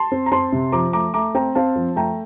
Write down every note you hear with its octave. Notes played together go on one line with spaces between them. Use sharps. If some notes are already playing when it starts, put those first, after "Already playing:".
Already playing: A5 C6
C4
A#5
C4 A5 C6
C3
F3 A#5 D6
A3 A#5 D6
A3 A#5 D6
C4 G5 A#5
C4 F5 A5
F3
A3 G5 A#5